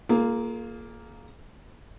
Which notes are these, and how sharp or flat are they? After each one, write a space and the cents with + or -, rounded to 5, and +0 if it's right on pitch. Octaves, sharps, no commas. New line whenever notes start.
A#3 +0 F4 +0 G#4 +35